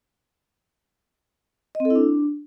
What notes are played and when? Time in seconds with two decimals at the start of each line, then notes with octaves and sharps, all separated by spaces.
1.75 D#5
1.80 C4
1.85 A4
1.90 E4
1.95 D4